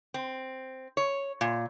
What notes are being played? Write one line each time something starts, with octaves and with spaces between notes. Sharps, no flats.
C4
C#5
A#2